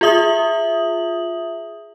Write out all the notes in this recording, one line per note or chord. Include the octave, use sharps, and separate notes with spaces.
F4 G#4 E5 D#6 F#7